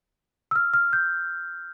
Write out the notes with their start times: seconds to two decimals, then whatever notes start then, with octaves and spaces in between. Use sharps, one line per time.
0.51 E6
0.55 F6
0.74 F6
0.93 G6